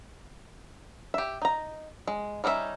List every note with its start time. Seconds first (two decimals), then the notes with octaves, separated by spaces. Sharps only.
1.14 G4 E5
1.42 D#4 A#5
2.07 G#3
2.44 G3 C#4 D#4 F#4 E5